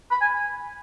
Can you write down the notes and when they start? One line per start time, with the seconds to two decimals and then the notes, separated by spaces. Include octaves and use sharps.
0.11 B5
0.21 G#5